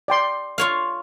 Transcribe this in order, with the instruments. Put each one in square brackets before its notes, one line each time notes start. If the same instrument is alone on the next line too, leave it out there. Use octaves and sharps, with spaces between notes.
[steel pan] D5 G5 C6
[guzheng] F4 C#5 F5